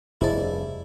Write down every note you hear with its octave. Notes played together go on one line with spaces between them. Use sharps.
F1 G2 E4 G#4 C5 D5 D#5